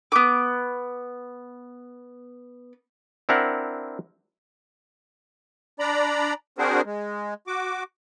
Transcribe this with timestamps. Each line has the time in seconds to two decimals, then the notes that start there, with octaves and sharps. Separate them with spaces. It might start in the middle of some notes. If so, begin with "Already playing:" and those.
0.12 B3 D6
3.29 C4 D4 E4 A#4 F#5
5.80 D4 D5 A#5 B5
6.58 C4 D4 F#4 G#4 A#4 C5
6.85 G#3
7.47 F#4 D6